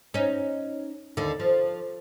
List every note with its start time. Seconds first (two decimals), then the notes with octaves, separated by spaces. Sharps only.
0.14 C#4 D#4
1.17 D#2 D3
1.40 F3